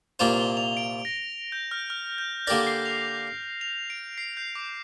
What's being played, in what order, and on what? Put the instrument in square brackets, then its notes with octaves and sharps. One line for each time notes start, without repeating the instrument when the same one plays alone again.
[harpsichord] C2 A#2 A#3 F4 C5 [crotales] F7
[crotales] G7
F7
D7
A#6
G6
F6
F6
G6
[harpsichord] D3 A#3 G4 A#4 D5 [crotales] A#6
[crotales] C7
F7
F7
D7
C7
G6
D6